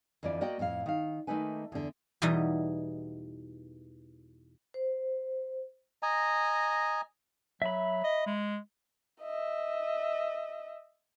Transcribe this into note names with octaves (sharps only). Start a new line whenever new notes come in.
F2 D3 E3 F3 D5
A#3 F#4 D5 D#5 G5
F2 A2 F#4 F5
D#3 F5
D#3 A3 A#3 D#4 B4 G#5
E2 D3
E2 B2 E3 G3 D#4 D#5
C5
D#5 G#5 A#5
F#3 E5 B5
D#5
G#3
D#5 E5